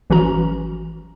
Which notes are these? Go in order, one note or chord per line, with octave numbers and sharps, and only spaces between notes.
G#1 E3 F3 C#4 F#4 A#5